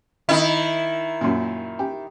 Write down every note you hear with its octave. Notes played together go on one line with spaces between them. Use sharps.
D#3 D#4 E4
F#2 A#2
G4